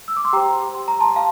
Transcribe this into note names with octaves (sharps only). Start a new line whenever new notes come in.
E6
D6
C6
G4 C5 G5 A#5
C6
A#5
A5 C6
F5 A5